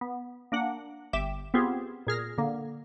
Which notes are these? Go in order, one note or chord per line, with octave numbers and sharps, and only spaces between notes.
B3
A#3 D4 F#5
G1 E5 G5 D6 E7
B3 C4 F4 G4 G#4
A#2 G#4 F6 A#6
D3 A#3